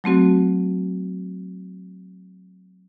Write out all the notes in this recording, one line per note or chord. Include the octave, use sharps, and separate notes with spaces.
F#3 A3 C4 F#4